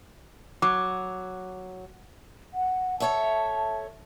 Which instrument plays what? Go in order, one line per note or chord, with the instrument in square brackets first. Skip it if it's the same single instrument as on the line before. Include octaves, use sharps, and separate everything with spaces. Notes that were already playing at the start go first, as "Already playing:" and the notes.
[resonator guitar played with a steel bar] F#3 [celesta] D6
[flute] F#5
[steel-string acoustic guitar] A4 C#5 E5 [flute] A5